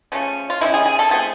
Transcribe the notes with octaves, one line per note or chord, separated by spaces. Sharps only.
C#3 F3 A3 C#4
F4
C3 D#3 G#3 C#4 E4
G#4
G#4
A4
F3 A3 C4 G#4